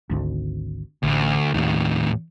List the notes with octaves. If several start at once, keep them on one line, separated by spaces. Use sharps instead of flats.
G#1 D2
A1 D2
D#2 A2 D#3